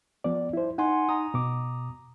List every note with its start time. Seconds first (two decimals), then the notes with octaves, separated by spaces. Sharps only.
0.24 F3 B3 D5
0.53 E4 C5
0.78 D#4 F#5 G#5 C6
1.09 D#4 A#5 D#6
1.34 B2 D6